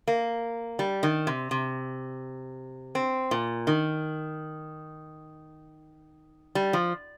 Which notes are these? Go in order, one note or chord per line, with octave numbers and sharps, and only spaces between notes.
A#3
G3
D#3
C3
C3
C4
A#2
D#3
G3
F3